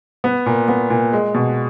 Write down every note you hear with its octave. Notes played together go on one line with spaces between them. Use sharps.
B3
A#2
B3
A#2
G#3
B2